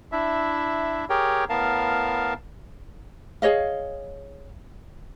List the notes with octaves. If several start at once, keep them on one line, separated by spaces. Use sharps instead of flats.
D4 E4 E5
G4 G#4 A#4 C#5 G5
A2 B3 A#4 F5 A5
G#4 C#5 D#5 F5